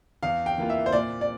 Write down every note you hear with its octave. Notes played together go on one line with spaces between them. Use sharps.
E2 F5
G5
E3 A#3 F4
E5
C5
A#2 D5
D5